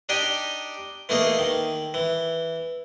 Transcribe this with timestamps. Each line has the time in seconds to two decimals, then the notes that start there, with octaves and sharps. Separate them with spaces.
0.09 D4 D#4 G4 G5 G#5
1.09 E3 A3 A#3 D#4 G#4
1.39 D#3
1.94 E3